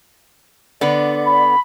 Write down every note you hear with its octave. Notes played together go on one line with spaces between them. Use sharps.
D3 B3 D5
B5